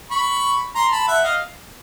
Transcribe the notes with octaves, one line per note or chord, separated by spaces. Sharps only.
B5 C#6
A#5 C6
A5 B5
E5 F#5
D#5 F5